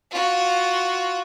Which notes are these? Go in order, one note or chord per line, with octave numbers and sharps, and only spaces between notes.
F4 F#4